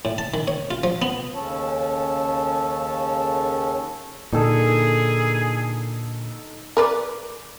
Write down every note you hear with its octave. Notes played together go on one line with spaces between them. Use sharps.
A2
A5
D#3
C#5
F4
F3
B3
D#2 C#3 C#4 A4 C#5 A5
A#2 D3 D#4 G#4 A4
A#4 B4 D5